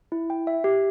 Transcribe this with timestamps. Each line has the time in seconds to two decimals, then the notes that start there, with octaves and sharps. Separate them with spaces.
0.12 E4
0.30 G5
0.47 E5
0.64 G4